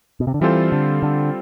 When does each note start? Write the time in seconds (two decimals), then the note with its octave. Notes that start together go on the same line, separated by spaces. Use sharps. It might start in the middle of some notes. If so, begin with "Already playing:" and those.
0.20 B2
0.27 C3
0.34 D3
0.41 E3 G3 C4 F4 A4 C5
0.72 D3
1.02 D3